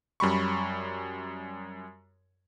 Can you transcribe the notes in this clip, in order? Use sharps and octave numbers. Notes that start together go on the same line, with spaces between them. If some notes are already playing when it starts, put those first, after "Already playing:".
F#2 G3 B5 C#6